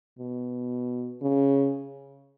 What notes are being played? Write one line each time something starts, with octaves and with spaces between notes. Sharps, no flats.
B2
C#3